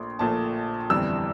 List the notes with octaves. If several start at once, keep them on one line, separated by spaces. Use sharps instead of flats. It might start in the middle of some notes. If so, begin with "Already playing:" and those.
Already playing: A#1 A#2 A3 C6
A#1 A#2 A3 A5
G1 F2 E3 G3 E6